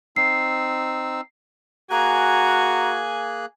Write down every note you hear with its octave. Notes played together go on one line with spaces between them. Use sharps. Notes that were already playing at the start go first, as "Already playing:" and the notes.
C4 D#4 E6 C7
A#3 F#4 G#4 G#5 A#5 F#6